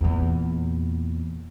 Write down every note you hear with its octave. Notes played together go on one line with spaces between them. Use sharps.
E2 A#2